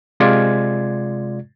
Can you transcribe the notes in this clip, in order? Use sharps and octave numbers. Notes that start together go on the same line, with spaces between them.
C3 G#3 F4 D5 G#6